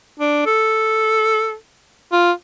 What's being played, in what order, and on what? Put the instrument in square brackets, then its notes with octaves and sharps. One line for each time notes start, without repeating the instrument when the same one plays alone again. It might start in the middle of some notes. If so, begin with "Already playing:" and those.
[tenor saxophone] D4
A4
F4